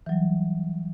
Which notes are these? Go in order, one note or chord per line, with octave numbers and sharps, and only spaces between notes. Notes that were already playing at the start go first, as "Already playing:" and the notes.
E3 F#3 G3